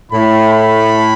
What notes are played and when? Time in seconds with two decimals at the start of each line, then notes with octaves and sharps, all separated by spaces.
0.12 A2 B5
0.53 B5